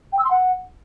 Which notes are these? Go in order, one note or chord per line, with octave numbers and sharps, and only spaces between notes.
G5
E6
C6
F#5